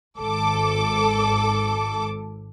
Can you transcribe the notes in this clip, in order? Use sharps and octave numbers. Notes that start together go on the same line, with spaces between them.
G#1 A4 D6